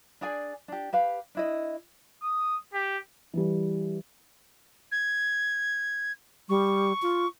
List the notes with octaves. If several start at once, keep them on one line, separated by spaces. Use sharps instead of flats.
D4 G#4 D5 G#5
D4 G4
G4 B4 F5
D4 E4 D#5
D#6
G4
E3 G3
G#6
G3 C#6
F4